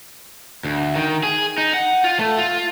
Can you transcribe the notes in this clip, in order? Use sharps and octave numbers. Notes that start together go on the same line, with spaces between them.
D2
D#3
G#4
D#4
F#5
F4
A3
F4